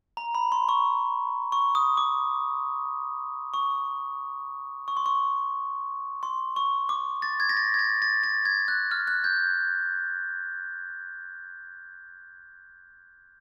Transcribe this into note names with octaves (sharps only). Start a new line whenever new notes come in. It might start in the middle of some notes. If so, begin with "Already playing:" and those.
A#5
B5
C6
C#6
C#6
D#6
D6
C#6
C#6
C6
C#6
C6
C#6
D6
A6
G#6
A#6
A6
G#6
A6
A6
A6
G#6
F#6
F6
F#6
G6